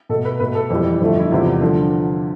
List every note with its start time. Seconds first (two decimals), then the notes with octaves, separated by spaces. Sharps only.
0.09 B2 A4
0.14 A3
0.25 B4
0.40 B2 A3 B4
0.55 A4
0.70 F2 E3 G3
1.00 F2 D3 F3 A3
1.19 E4
1.31 E2 C3 G3 F4
1.61 D3 F3